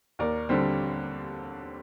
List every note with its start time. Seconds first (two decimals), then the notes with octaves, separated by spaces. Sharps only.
0.19 D#2 A#4 D5
0.49 D3 G3 C4